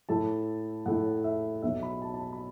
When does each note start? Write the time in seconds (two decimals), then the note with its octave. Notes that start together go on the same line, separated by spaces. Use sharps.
0.09 A2 A3 E4 A5
0.86 A2 A3 E4 F#5
1.24 E5
1.62 B1 B2 F#3 B3 E5
1.83 B5
2.02 A5
2.14 A5
2.20 B5
2.33 B5